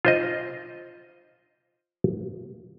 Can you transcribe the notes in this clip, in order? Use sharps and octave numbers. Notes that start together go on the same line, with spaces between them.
F4 C5 D#5